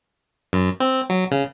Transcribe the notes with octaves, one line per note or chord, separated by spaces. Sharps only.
F#2
C4
F#3
C#3